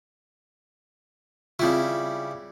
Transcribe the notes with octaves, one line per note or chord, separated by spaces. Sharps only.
C#3 G3 C4 E4 F4